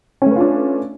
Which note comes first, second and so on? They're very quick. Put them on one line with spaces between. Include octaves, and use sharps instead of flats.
C#4 A3 B4 F4 D4